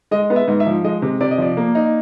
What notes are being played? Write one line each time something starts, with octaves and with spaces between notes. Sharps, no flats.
G#3 D#5
B3
E5
G#2
E5
F3
G#3 D#5
C3
C3 D5
D#5
F3 D5
A#3
D#4